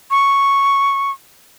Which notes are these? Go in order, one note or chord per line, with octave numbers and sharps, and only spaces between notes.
C#6